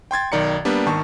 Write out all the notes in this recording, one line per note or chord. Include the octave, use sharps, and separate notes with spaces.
G5 C6 G#6 A6
B1 D#3 D5 A#5 C#7
G3 A#3 B3 D4
G#1 D#3 A5 C#6